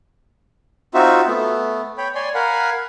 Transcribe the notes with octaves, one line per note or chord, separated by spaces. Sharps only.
C4 D#4 F4 F#4 E5
A3 B3
C#5 G5 B5
C#5 D5 G#5 C6
A#4 F5 F#5 G#5 B5